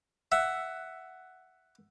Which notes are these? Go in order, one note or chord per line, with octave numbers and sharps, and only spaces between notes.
E5 F#5